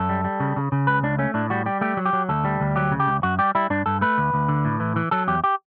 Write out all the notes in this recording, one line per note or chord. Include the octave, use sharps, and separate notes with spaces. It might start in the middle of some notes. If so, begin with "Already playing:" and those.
Already playing: F#2 A4
G3
G3
C#3
C#3
C#3
C#2 B4
C#2 D4
A3 C#4
A2 D4
G3 F#4
G3 G4
A3 G4
F#3
G4
F#3
D2 A4
G3
D2
F#3 G4
C#3
G4
C#2
F#2 F#4
G3 G4
G3 E4
G2 D4
G2 A4
A3 B4
D2
D2
D3
A2
E3
E3
F#3 A4
E2 G4
G4